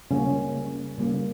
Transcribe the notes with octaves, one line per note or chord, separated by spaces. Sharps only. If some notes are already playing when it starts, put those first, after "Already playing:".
C#3 G3 A#3 C#4
C#3 G3 A#3